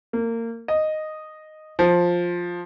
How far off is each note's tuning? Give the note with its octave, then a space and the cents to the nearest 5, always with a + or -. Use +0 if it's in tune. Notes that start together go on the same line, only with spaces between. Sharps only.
A#3 -30
D#5 -5
F3 +5